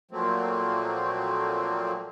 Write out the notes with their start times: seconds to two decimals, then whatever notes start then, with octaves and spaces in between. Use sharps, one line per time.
0.11 A#2 F3 F#3 A3 A#3 C4